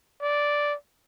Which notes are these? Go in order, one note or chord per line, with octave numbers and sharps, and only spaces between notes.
D5